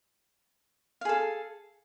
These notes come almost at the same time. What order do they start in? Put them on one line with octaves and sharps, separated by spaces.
F5 G#4 A4